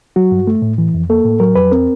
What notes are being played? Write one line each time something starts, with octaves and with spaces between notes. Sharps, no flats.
F#3 F#4
G2
A3
A2
E3
F2
A#3 A4
A2
F#3 A#4
F2 B4
C4 A#4